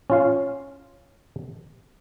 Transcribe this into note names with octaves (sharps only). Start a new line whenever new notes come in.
C#4 F4 F5